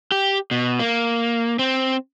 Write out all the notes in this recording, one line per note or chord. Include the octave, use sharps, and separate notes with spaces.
G4
B2
A#3
C4